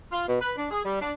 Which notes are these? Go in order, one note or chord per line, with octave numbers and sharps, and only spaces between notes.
F4
B2
B4
D4
G#4
G3
D4